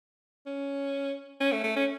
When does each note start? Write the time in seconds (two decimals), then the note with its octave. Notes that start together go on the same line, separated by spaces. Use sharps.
0.46 C#4
1.40 C#4
1.52 A3
1.64 A3
1.76 C#4